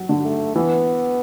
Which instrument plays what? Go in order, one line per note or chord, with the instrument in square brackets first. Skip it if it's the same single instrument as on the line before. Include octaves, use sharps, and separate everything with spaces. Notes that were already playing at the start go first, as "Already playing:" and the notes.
Already playing: [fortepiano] F#3
D3
[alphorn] A3
[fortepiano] E3 [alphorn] B3